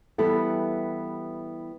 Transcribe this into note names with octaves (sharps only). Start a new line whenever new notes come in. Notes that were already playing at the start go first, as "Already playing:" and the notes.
E3 G3 B3 E4 G4 A4